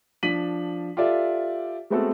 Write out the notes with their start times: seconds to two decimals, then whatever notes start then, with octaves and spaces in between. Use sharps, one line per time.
0.23 F3 D4 B6 D#7 F#7
0.97 F4 G4 A4 D5 E5
1.90 G#3 A3 B3 C4 F#4 A4